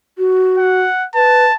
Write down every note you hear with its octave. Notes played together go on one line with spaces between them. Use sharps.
F#4
F#5
B4 A5